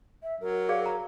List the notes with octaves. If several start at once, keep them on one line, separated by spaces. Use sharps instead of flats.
E5
F#3 A#4
G#4 D5 F5
A#5